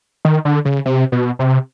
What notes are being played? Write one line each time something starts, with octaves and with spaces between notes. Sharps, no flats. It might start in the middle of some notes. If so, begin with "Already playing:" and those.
D#3
D3
C#3
C3
B2
C3